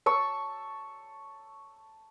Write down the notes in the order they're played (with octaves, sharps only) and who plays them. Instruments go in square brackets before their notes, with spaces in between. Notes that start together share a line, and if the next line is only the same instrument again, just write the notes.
[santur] A5 C#6 E6